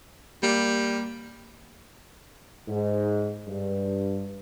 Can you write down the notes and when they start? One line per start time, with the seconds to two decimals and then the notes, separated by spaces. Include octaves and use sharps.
0.43 G3 A#3
2.68 G#2
3.48 G2